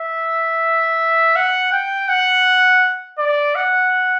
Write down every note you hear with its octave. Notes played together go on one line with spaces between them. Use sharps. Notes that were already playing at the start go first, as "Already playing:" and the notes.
Already playing: E5
F#5
G5
F#5
D5
F#5